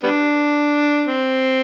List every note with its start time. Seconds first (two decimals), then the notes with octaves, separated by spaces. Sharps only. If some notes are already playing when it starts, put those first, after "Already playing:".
0.03 G3 B3 D4
1.06 C4